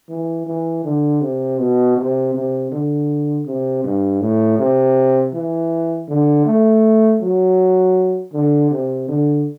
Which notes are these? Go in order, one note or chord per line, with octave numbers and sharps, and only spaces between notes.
E3
E3
D3
C3
B2
C3
C3
D3
C3
G2
A2
C3
E3
D3
A3
F#3
D3
C3
D3